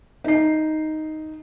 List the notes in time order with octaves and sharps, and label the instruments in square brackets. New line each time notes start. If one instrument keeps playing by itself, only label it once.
[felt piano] D#4 C7